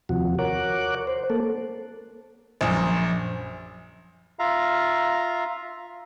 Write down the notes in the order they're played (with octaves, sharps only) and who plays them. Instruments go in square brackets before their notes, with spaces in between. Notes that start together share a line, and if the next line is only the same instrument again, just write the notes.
[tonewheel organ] D#2 C3 F3 F#4
A#4 C#5 F#5 D6 F#6
C5
A#3 A4
[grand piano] A#1 F#2
[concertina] F4 E5 F5 A#5